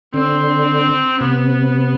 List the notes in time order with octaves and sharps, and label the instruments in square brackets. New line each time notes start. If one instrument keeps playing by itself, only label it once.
[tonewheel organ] D3 [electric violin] C4
[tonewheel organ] C3 [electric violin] B3